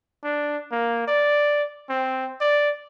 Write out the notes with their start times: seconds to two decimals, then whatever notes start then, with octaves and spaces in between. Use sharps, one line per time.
0.23 D4
0.72 A#3
1.07 D5
1.90 C4
2.41 D5